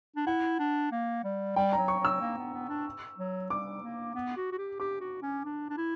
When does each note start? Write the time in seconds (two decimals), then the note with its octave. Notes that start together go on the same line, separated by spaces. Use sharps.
0.16 D4
0.27 E4 F#5
0.59 D4
0.92 A#3
1.24 G3
1.56 G3 G5
1.73 A#5
1.78 F#3
1.88 C#6
2.00 F#3 E6
2.21 A#3
2.38 B3
2.54 B3
2.69 D4
3.18 F#3
3.50 G3 D6
3.82 A#3
4.15 B3
4.37 F#4
4.52 F#4
4.58 G4
4.80 G4 D6
5.00 F#4
5.22 C#4
5.45 D4
5.70 D4
5.77 E4